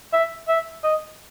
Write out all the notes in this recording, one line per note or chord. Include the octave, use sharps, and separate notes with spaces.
E5
E5
D#5